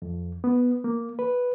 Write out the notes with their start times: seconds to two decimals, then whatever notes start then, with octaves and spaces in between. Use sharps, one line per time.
0.02 F2
0.44 B3
0.84 A#3
1.19 B4